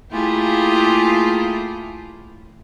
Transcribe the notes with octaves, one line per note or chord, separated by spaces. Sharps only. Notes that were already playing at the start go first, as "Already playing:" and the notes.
A3 A#3 E4 F4 G4 G#4